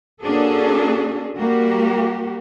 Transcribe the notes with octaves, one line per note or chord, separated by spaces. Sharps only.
A#3 C#4 D4 F#4 G#4 A4
G3 A#3 F#4 G4